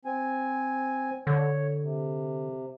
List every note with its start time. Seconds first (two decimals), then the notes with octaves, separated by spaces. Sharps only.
0.05 C4 G#5
1.27 D3 C#5
1.83 C3